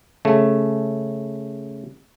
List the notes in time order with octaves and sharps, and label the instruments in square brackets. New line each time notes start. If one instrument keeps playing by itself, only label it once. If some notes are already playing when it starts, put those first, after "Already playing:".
[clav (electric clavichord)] C#3 A3